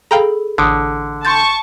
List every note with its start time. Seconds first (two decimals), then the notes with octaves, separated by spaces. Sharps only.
0.11 G#4 A4 F5 G5 A#5 B5
0.58 A1 D3 D#6 D7
1.25 A5 C6 C#6 G6 A6